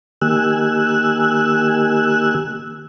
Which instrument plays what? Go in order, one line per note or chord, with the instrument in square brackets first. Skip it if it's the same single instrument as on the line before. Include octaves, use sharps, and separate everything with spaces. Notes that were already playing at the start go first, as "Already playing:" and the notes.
[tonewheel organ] D#3 A#3 G4 G#5 E6 F#6